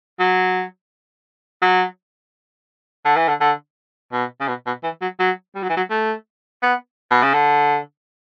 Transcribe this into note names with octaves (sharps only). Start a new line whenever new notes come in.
F#3
F#3
D3
E3
D3
D3
B2
C#3
B2
B2
E3
F#3
F#3
G3
F#3
E3
F#3
A3
B3
B2
C#3
D3